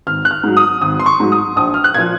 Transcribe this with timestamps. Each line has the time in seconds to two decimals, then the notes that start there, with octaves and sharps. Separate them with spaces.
0.07 G#1 F6
0.25 F#6
0.31 F6
0.43 G#2 F#3
0.57 D#6
0.81 G#1 D#6
1.00 C6
1.06 C#6
1.20 G#2 F#3
1.32 D#6
1.56 A#1 D#6
1.74 F6
1.84 F#6
1.94 A#2 F3 G#6